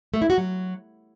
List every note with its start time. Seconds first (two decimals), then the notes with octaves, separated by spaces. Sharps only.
0.14 A3
0.22 E4
0.30 F#4
0.38 F#3